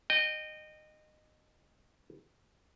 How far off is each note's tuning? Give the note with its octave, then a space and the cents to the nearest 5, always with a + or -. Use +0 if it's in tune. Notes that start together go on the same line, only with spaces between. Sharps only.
D#5 -20 G5 +0